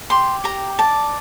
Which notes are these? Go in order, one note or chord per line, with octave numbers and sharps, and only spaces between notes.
G4 C6
G4 A#5
D5 A5